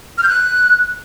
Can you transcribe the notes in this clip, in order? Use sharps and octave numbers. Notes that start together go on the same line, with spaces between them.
F6
G6
F#6